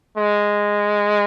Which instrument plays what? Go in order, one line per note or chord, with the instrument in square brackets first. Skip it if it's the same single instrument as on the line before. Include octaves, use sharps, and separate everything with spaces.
[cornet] G#3